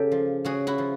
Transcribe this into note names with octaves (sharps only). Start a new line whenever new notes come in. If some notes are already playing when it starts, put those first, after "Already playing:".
Already playing: C#3 G4 A4
F3
C#3 F#4 G#4
E4 F#4
F3